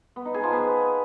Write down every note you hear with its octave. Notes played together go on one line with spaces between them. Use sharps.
B3
D#4
G#4
F3
B3